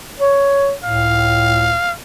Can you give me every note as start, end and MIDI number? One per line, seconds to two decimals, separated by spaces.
0.19 0.73 73
0.85 1.78 37
0.85 1.78 45
0.85 1.92 77